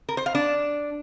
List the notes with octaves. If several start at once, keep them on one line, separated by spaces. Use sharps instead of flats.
A#4
C5
F5
D4